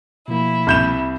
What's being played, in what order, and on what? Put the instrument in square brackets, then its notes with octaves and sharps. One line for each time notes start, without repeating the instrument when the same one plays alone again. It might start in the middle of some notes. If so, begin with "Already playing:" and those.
[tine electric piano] B2 F3 A#3 [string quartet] E4
[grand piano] C2 G6 E7